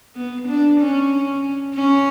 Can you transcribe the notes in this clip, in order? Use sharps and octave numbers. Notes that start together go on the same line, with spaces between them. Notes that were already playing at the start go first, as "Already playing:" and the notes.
B3
D4
C#4
C#4